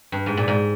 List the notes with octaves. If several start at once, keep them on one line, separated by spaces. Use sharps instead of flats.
G2
G#2
A#2
G#2